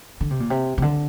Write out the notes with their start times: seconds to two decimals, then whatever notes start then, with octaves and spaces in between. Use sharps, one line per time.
0.21 D3
0.31 C3
0.40 A#2
0.50 C3
0.78 C3
0.82 D3